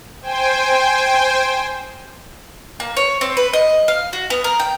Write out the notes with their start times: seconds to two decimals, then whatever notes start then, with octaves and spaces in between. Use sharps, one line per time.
0.22 C5 G5 G#5
2.80 A#3
2.97 C#5
3.21 C4
3.37 B4
3.53 D#5
3.88 F5
4.13 F#4
4.30 B3
4.44 A#4
4.60 G5